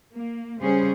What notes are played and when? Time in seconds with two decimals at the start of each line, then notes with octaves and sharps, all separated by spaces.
0.13 A#3
0.60 C#3 G3 C#4 G#4 C5